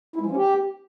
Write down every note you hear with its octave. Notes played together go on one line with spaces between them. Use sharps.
E4
G#3
F3
C#4
G4